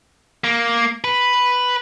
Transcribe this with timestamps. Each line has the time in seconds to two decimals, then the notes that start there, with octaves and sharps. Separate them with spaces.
0.44 A#3
1.04 B4